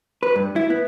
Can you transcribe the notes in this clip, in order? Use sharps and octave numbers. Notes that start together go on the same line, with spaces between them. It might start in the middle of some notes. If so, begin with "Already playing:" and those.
B4
G2
E4
B3